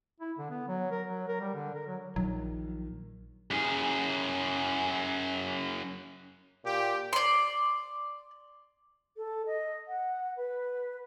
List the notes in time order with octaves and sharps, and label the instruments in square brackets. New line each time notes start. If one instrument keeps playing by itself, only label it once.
[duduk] E4
D3
B3
F#3
A#4
F#3
A#4
G3
D3
A#4
F#3
[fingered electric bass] A#1 D#3 [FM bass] F#3
[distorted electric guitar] F#2 G#4
[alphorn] A#2 [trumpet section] G4
[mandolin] D5 C6
[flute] A4
D#5
F#5
B4